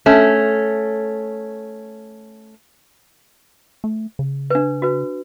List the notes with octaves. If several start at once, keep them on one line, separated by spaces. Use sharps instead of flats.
A3 C#4
A3
C#3
D4 B4
F#4 B4